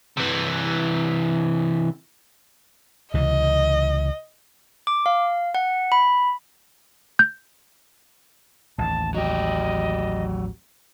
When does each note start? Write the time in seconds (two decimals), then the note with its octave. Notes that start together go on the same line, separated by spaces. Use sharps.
0.17 C3 E3
3.14 C#2 C3 E3 D#5
4.87 D6
5.06 F5
5.55 F#5
5.92 B5
7.19 G6
8.78 A1 D#2 A5
9.14 F#3 G4 D#5